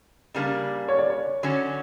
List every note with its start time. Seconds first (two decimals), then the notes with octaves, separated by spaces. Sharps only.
0.34 C#3 G3 A#3 D4
0.88 C#5
0.99 D5
1.10 C#5
1.43 D3 F#3 C#4